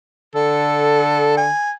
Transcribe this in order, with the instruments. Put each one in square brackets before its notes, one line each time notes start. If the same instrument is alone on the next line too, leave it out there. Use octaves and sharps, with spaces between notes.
[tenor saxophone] D3 [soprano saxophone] A4
[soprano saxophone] G#5